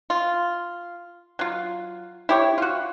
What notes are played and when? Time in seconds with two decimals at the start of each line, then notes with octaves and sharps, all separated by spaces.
0.10 F4
1.39 F#3 F4
2.29 E4 G4 C#5
2.58 F4 F#4